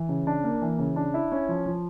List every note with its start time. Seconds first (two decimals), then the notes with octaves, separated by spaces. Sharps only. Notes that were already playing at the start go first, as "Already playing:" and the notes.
Already playing: E3
0.09 C#3
0.27 D4
0.44 A#3
0.61 E3
0.79 C#3
0.96 D4
1.14 E4
1.32 C#4
1.49 F3
1.66 F3